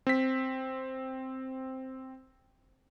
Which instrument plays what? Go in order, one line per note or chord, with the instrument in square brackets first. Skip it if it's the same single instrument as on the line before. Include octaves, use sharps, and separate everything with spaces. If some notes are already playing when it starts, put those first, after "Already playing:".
[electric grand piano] C4 B6